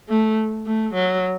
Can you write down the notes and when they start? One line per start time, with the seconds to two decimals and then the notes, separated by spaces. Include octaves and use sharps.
0.09 A3
0.66 A3
0.94 F#3